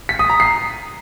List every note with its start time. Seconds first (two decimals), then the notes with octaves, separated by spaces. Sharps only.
0.09 B6
0.19 D#6
0.30 A#5
0.40 C7